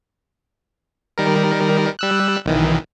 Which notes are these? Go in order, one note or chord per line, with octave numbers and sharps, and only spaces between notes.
D#3 G3 A#4
G3 E6 F#6
B1 D#3 E3